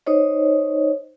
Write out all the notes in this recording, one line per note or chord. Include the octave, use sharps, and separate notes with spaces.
D#4 C5 C#5 D#5